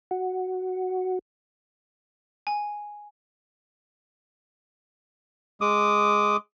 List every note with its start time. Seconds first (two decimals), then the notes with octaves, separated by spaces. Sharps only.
0.11 F#4
2.47 G#5
5.61 G#3 D6 D#6